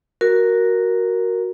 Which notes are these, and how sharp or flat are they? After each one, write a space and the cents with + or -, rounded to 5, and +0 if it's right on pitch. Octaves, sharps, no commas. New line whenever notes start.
F#4 +0 A#4 +0